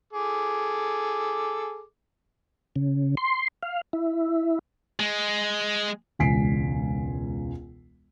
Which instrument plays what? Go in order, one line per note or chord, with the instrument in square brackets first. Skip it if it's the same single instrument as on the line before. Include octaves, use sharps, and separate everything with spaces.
[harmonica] G#4 A4 D6
[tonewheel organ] C#3
C6
F5
E4
[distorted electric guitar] G#3
[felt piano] E1 C#2 G#5 B6 C7 D7